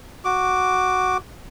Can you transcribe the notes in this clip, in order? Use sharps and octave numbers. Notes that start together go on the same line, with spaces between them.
F#4 D6